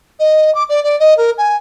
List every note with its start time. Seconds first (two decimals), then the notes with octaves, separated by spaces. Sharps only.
0.19 D#5
0.54 D6
0.69 D5
0.83 D5
0.99 D#5
1.17 A#4
1.37 G#5